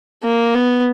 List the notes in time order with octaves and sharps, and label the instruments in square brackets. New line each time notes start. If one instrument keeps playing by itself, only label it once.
[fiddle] A#3
B3